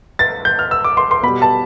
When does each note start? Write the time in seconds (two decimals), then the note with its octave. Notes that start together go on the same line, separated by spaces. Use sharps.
0.19 A6
0.45 G6
0.59 F6
0.71 E6
0.84 D6
0.97 C6
1.11 C6
1.23 B2 G3 B5
1.42 A5